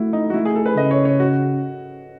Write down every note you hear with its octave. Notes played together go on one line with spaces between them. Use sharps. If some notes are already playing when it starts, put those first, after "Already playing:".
Already playing: A3 E4 F#4
D#4
F#4
A3 E4
G#4
A4
B4
C#3 D#5
C#5
C#5
F#4